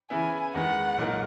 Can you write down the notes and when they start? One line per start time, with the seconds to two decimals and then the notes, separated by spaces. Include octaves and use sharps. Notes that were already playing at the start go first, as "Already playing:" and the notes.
0.10 C#3 E3 B3 E4 B4 G#5
0.54 E2 D#3 G#3 B3 F#5
0.98 B1 A#2 G#3 D#4 A#4